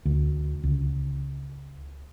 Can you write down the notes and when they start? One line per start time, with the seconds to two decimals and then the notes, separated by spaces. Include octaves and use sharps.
0.05 D2
0.63 C#2